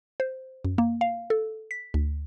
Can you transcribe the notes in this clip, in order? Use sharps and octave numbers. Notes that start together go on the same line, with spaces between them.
C5
F#2
A#3
F5
A4
B6
D2